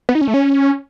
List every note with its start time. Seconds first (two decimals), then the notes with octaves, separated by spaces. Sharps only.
0.09 B3
0.15 D#4
0.21 C#4
0.28 A3
0.34 C#4